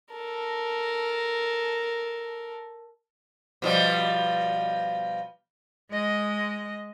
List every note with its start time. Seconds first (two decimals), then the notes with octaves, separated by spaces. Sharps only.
0.12 A4 A#4
3.62 B2 F3 G3
5.91 G#3 D#5